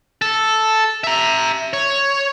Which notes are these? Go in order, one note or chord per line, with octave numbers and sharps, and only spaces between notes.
A4
E5 A#5
C#5